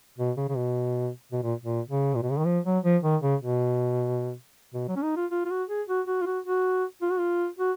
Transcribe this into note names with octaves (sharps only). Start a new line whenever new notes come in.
B2
C#3
C#3
B2
B2
A#2
A#2
C#3
A#2
B2
C#3
D#3
F3
F#3
F3
D#3
C#3
B2
B2
F#3
C#4
D#4
F4
F4
F4
F#4
G#4
F#4
F#4
F4
F#4
F#4
F4
F#4
F4
F#4